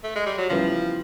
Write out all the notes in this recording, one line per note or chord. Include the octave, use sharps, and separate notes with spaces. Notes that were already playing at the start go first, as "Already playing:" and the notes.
A3
G#3
G3
F#3
C#3 E3 F3 G3 B3 E4